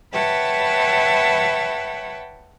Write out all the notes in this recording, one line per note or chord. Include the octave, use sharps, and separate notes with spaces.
B4 C#5 E5 F#5 G5 A5